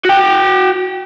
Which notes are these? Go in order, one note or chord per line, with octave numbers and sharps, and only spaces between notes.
F#4 G5